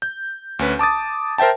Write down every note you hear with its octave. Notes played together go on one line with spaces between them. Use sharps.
G6
D2 C#4 B4
A5 D6 D#6 A6
A#4 C5 E5 G5 A5